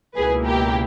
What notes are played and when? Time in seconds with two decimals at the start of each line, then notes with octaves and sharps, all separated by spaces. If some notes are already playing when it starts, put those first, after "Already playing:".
0.15 C#2 B2 A#3 E4 G#4 B4
0.45 G4 A#4